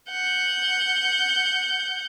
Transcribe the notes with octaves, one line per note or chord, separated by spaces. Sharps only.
F#5 G6